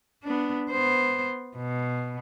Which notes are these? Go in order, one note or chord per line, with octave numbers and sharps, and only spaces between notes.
B3 D4
B3 C5
B2